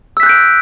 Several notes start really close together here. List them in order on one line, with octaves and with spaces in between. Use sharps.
E6 B6 F#6 G6 D7